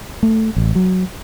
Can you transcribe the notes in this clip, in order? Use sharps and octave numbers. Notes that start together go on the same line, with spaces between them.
A3
A1
F#3